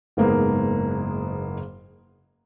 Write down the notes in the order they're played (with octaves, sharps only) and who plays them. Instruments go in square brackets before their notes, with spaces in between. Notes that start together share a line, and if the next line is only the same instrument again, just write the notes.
[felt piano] F#1 G#2 A#3 B3 G#4